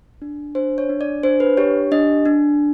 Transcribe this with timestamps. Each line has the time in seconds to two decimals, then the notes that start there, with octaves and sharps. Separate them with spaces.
0.22 D4
0.55 D4 C5
0.78 C#5
0.89 D4
1.01 D5
1.23 D4 C5
1.40 B4
1.57 G4 C#5
1.91 D4 D#5
2.25 D4